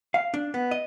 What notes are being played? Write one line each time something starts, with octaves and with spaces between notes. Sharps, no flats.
F5
D4
B3
D#5